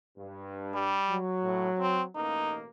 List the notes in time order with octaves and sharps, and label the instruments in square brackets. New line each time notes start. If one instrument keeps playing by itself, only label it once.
[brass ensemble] G2
[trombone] G3
[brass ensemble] F#3
[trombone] A2
C4
[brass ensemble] A1 B2 A#3 [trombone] D#4